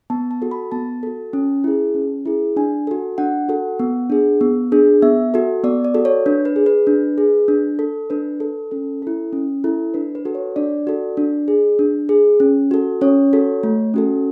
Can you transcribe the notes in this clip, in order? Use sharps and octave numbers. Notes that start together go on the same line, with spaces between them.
B3 A5
A5
F#4 A4
B5
B3 A5
F#4 A4
C#4
E4 G#4
C#4
E4 G#4
D4 G#5
F#4 A4
D4 F#5
F#4 A4
B3
D4 G#4
B3
D4 G#4
B3 E5
F#4 A4
B3 D5
D5
F#4 A4
C#5
D4 B4
B4
G#4
B4
D4
G#4
D4
A4
D4 B4
A4
C#4 A4
E4 A4
C#4
E4 A4
D4 B4
B4
F#4 A4
C#5
D4 D5
F#4 A4
D4
G#4
D4
G#4
C#4
F#4 A4
C#4 C#5
F#4 A4
A3
C#4 F#4 A4